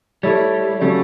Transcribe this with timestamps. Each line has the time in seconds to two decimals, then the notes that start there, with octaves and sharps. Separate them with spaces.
0.23 G3 A3 E4 A4 C#5
0.81 C#3 F#3 G3 A3